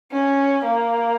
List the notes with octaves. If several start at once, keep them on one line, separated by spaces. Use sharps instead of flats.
C#4
A#3